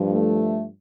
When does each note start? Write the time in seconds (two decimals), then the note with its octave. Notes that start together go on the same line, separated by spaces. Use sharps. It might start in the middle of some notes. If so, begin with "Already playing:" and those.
Already playing: G2 F3
0.11 A3